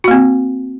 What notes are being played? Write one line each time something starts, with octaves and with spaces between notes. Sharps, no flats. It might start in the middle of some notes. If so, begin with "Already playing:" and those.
A#3 C4 F#4